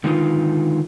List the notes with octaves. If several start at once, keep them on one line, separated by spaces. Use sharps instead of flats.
D3 D#3 G#3 D#4 F4 B4